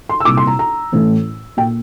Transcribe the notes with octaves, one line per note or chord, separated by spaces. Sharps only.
C6
E6
C2 A#2 D6
C6
A#5
A#5
A1 A2 E3
A#2 G5